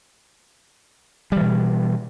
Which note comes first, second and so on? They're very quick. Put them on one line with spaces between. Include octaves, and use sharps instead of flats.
G3 E3 B2